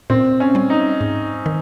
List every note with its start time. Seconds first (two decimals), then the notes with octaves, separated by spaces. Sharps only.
0.10 A#2 C4
0.40 C#4
0.55 G3 C#4
0.70 D#4
1.01 G#2
1.46 D#3